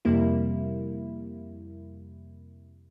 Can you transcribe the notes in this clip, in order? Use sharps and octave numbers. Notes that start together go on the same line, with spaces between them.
F2 C3 G3 A#3 E4